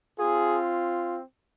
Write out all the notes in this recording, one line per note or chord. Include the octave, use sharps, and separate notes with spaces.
C4 F4 G#4